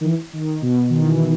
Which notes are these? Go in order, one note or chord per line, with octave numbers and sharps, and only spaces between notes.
D#3
E3
D#3
B2
D#3
E3